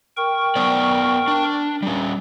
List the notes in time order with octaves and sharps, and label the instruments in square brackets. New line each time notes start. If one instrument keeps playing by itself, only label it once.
[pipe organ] A#4 G5 C#6
[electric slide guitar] B3 C5 D5
D4
G3 C#4